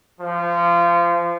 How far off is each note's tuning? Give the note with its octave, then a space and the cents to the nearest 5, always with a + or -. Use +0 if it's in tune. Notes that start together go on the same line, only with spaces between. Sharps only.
F3 -25